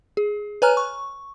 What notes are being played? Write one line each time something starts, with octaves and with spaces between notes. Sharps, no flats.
G#4
B4 C#5 G#5 A#5 F6 F#6
C#6